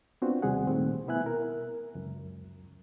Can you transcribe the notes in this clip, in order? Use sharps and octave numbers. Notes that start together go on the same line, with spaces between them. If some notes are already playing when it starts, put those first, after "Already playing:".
B3 C4 D4 F4 F#4 C5
D#2 C3 G3 C4 G#4 F#5
A#2 D#3 A3 C4
B2 B3 E4 E5 G#5 F#6
A#4
C#2 F#2